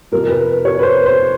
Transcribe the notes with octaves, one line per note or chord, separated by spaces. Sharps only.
F2 C3 F3 A#4
B4
C#5
B4
C5
C5